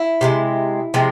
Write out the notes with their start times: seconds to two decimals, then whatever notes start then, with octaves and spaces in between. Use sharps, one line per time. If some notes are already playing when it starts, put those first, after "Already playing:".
Already playing: E4
0.21 C3 F3 G#3
0.94 C3 F3 G#3